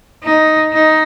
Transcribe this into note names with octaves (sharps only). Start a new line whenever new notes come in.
D#4
D#4